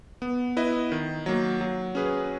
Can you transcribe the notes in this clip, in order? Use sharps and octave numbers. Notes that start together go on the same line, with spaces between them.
B3
E4 B4 D#5
D#3
F#3 A#3
F#3
C#4 G#4 B4